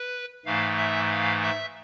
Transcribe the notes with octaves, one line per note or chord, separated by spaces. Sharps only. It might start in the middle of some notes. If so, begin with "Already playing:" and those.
Already playing: B4
G#2 E3 A3 F5
E5
F5
E5